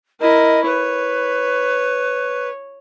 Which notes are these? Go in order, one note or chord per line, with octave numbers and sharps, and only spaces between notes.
E4 A#4 D#5
B4 C#5